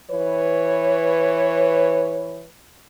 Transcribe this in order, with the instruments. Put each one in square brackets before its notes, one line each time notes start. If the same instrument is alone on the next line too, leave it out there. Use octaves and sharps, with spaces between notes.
[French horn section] E3 B4 C#5